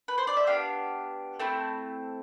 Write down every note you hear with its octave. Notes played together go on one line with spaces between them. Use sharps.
B4
C5
D5
E5
B3 D4 G4 F5
A3 C4 E4